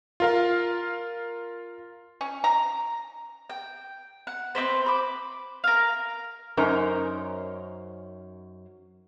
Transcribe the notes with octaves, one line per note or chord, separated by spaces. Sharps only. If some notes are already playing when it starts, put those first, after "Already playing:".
F4 A#4 F5
C#4
A#5
G5
F#5
C4 D4 B4 C5
B5 D6
A#4 F5
F#2 C#4 D#4 A#4 C5 A#5